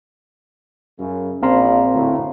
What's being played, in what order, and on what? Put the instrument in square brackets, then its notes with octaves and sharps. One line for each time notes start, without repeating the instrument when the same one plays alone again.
[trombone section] F#2 C#3
[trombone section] A#1 F3 [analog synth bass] C4 [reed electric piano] F5 A#5 C6
[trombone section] D2 A2